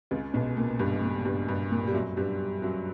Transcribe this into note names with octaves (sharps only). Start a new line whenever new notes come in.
C#2 C#3
B1 B2
A#2
G2
A#2
G2
G2
A#2
G3
F#2 F#3
G2 G3
F#2 F#3